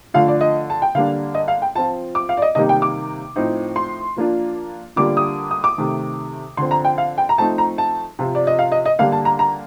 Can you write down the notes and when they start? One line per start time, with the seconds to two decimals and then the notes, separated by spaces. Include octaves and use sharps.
0.14 D3 F3 A3 D4 F4 F5
0.28 D5
0.41 D#5
0.70 A5
0.82 G5
0.95 D3 G3 A#3 D4 F5
1.34 D#5
1.48 F5
1.62 G5
1.76 F3 C4 F4 A5
2.15 D6
2.29 F5
2.37 D5
2.42 D#5
2.55 C3 D#3 G3 A#3 D#4 D#5
2.69 G5
2.82 D6
3.36 A2 F3 C4 D#4
3.76 C6
4.16 F3 A#3 D4 F4
4.96 D3 G3 A#3 D4 F4 D6
5.17 D#6
5.51 D#6
5.64 D6
5.78 C3 D#3 A3
6.57 D3 F3 C4 C6
6.71 A#5
6.85 G5
6.98 F5
7.18 G5
7.29 A#5
7.38 F3 A3 C4 D#4 A5
7.58 A#5
7.78 A5
8.19 C3 F3 C4 F4
8.35 D5
8.47 D#5
8.59 F5
8.72 D#5
8.85 D#5
8.99 D3 G3 A#3 D4 F5
9.12 A5
9.25 A#5
9.39 A#5